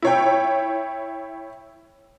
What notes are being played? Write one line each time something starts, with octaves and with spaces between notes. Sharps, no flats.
E4 C#5 G5